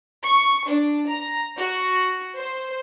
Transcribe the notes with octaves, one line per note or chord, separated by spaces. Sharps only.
C#6
D4
A#5
F#4
C5